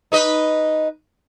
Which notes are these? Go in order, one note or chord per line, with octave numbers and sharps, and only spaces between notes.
D#4 B4 D#5